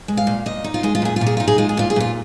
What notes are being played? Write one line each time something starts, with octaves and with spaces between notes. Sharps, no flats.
G#3
F5
A#2
A#2 D#5
D#4
F4
G#3 G#4
F4
A#2 G#4
F4
A#2
G#4
D#4 F4
G#4
G#3 F4
G#4
A#2 F4
G#4
A#2 F4